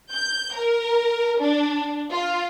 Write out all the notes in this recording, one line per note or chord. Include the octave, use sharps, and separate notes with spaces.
G6
A#4
D4
F4